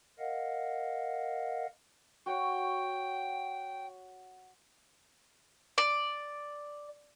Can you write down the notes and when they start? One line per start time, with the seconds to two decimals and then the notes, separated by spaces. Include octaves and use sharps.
0.19 A#4 D#5 F5 F#5
2.26 F#4 C#5 F#5 G5
5.78 D5